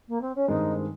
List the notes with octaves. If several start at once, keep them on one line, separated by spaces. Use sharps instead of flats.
A#3
C4
C#4
G2 D#3 G#3 C4 D#4